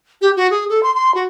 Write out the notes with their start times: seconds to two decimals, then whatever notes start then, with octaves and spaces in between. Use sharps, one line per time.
0.21 G4
0.36 F#4
0.50 G#4
0.69 A4
0.83 C6
0.95 C6
1.14 F#4